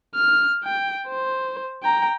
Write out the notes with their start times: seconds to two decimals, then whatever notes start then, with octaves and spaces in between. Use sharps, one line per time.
0.14 F6
0.64 G5
1.07 C5
1.83 G5 A#5